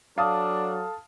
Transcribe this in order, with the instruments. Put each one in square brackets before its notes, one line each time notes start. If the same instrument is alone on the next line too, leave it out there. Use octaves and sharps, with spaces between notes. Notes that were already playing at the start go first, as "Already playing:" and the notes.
[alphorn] F#3 [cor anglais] D4 [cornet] A4 [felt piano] F5 A5 D#6